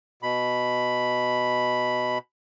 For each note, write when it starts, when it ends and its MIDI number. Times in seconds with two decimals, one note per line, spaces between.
0.23 2.18 47
0.23 2.18 83